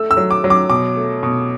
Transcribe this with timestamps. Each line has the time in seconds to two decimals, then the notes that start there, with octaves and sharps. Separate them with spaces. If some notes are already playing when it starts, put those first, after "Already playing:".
Already playing: A3 E6
0.11 E6
0.17 F#3
0.31 D6
0.44 F#3
0.50 D6
0.70 B2 D6
0.96 A3
1.23 B2